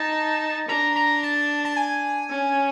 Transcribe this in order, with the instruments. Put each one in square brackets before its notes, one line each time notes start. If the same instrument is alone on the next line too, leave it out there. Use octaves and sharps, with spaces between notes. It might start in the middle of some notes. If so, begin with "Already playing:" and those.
Already playing: [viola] D#4 [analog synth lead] A5
[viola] D4 [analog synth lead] A#5
[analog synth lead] A#5
A5
A5
G#5
[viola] C#4